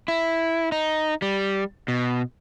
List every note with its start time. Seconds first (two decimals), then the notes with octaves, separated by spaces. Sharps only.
0.08 E4
0.72 D#4
1.22 G3
1.88 B2